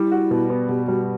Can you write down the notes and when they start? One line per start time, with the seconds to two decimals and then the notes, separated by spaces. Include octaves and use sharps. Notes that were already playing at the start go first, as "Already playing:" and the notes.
Already playing: G3 E4
0.11 F#4
0.31 B2
0.50 B3
0.69 B2 G4
0.88 G3 F#4